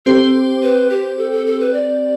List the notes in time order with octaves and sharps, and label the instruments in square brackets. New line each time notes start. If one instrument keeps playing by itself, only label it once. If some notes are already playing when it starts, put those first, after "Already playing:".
[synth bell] C4 G4 C5 [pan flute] A4
[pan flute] B4
G4
A4
A4
A4
B4
D5